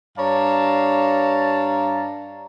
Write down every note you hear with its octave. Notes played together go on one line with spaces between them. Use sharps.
G2 C#5 D5 F5 A5 A#5